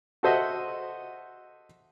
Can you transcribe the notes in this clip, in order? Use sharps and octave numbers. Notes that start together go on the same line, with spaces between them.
F#4 A4 C5 D#5 E5 F#5